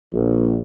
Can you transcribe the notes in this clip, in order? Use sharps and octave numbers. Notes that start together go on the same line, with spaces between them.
A#1